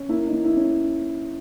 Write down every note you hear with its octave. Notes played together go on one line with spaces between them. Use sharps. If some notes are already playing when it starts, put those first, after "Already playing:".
Already playing: C#4
A#3 E4
D#4
E3
E4
C#4